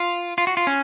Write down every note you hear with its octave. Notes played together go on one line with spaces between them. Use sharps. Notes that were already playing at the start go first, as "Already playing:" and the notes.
Already playing: F4
F4
F#4
F4
C#4